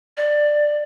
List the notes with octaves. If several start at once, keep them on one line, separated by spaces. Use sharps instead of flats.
D5